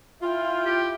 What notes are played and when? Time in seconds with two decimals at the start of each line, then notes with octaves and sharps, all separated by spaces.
0.22 E4 F4 G5
0.65 G4